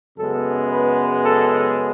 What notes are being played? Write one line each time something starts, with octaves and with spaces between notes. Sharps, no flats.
F#2 C#3 G#3 B3 A4
B4
A4